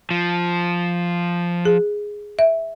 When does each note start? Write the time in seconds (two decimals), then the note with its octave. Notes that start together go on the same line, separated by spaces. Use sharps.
0.11 F3
1.65 G#4
2.39 E5